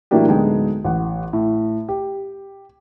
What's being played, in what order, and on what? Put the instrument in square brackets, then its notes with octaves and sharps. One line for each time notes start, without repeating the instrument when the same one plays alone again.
[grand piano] A2 E3 F#3 A#3 D4 G4
D1 D3 G#3 B3 D#4 G5
A1 F#5
A2
G4